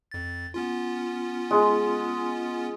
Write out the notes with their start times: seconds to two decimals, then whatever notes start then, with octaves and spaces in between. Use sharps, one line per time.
0.11 F2 A6
0.54 B3 C#4 F4
1.51 G#3